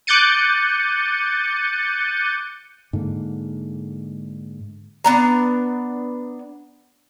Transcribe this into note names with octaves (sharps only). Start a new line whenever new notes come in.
D6 F#6 G6 A6 C#7 D#7
G#2 D3 A#3
B3 D4 A#5